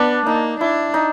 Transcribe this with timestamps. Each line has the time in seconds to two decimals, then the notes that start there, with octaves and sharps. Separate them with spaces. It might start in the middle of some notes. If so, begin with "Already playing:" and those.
Already playing: B3 D4
0.26 A#3 D#4
0.61 D4 E4
0.94 D#4